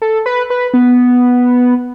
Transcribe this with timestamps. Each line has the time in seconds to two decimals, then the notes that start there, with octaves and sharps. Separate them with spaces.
0.02 A4
0.26 B4
0.50 B4
0.74 B3